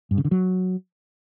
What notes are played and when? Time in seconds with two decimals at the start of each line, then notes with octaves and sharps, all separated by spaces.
0.11 G2
0.18 C#3
0.25 D3
0.31 F#3